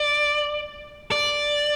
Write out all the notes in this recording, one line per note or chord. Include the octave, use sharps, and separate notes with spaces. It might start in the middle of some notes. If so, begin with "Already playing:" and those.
Already playing: D5
D5